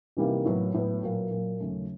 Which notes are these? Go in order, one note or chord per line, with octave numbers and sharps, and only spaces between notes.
C3 E3 G3 A#3 D#4
A2 F#3 B3
A2 F#3 B3
A#2 F#3 A#3
A#2 F#3 A#3
D#2 C#3 F#3 A3 C#4